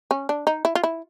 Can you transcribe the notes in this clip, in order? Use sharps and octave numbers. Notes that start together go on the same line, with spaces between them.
C#4
D4
D#4
E4
F4
E4